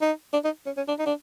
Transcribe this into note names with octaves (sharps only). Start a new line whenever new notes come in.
D#4
D4
D#4
C#4
C#4
D4
D#4
D4